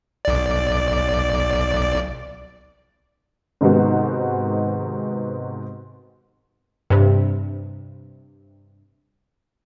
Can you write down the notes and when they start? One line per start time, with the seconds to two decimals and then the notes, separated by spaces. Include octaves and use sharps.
0.25 B1 D5
3.61 G#2 C3 D#3 G#3 B3 F#4
6.90 G2 C3